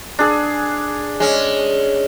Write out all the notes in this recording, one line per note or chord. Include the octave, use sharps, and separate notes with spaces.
D4 G#4
G#3 C#4